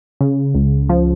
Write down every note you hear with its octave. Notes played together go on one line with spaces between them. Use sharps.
C#3
C#2
F3